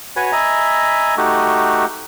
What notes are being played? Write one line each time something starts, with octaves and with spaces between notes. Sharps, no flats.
F#4 B4 C#5 G#5
D#5 E5 G#5 A#5 B5
A3 D#4 F#4 G4